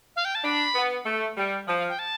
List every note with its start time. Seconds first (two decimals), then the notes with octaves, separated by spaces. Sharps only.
0.16 F5
0.25 G5
0.35 A5
0.44 D4 B5
0.75 B3
1.06 A3
1.37 G3
1.68 F3 A5
1.78 F5
1.89 G5
1.99 A5